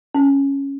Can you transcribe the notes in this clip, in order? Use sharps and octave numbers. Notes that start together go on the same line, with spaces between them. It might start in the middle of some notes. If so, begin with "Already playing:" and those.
C#4